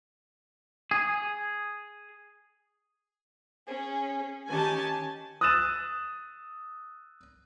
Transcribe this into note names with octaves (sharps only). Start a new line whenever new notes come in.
G#4
C#4 G#4
D#3 C#4 G4 G#5 A5
D#6 E6 F#6 A6 D#7 E7